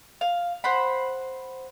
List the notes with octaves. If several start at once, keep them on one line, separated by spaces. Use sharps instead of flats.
F5
C5 F#5 B5